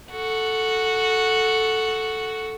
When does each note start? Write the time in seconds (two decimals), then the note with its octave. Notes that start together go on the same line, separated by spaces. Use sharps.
0.11 F#4 A4